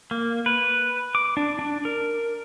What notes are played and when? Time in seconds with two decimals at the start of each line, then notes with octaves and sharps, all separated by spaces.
0.11 A#3
0.46 B4
1.15 D6
1.37 D4
1.59 D4
1.85 A#4